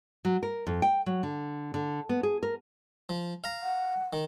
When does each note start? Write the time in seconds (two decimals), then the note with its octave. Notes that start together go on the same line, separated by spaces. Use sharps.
0.25 F#3
0.43 A#4
0.67 F2
0.82 G5
1.06 F#3
1.23 D3
1.74 D3
2.09 B3
2.23 G#4
2.43 A#4
3.09 F3
3.44 F5 A#5
3.62 F#5
4.13 D#3